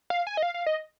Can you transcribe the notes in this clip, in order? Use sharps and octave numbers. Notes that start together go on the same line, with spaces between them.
F5
G#5
D#5
F5
F5
D#5